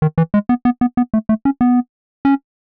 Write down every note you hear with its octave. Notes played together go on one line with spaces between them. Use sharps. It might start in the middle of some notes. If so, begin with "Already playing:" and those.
D#3
E3
G#3
B3
B3
B3
B3
A3
A3
C#4
B3
C#4